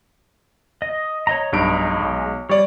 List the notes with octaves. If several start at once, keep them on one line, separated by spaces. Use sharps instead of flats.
D#5
C#5 D#5 A#5
B1 G2 G#3 D#5 A#5 D7
B1
G3 C#5 D5